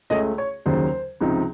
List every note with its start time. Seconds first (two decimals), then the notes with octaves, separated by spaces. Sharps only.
0.10 C#2 C#3 A3 C#4 D#5
0.38 C#5
0.66 D#2 C#3 F#3 C5
1.21 C#2 C3 F3 C4 D#4